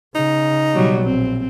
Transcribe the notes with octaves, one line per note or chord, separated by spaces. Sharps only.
C#3 D#4
B2 F#3 G3
A#1 C4